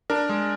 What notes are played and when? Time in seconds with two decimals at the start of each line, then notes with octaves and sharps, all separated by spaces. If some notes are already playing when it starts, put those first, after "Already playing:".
0.10 D4 A#4
0.29 G#3